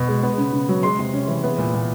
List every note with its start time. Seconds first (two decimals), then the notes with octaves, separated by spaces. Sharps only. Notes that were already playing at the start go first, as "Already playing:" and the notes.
Already playing: B2
0.08 G#3
0.23 B3
0.38 C#3
0.53 C#3
0.69 F#3
0.83 G#3 C6
0.99 C3
1.14 C#4
1.28 E3
1.44 B3
1.58 A#2
1.74 A#2